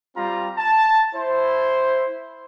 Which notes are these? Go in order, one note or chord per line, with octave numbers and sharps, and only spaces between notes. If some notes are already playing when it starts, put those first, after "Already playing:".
G3 C4 F4 A#5
A5
E4 C5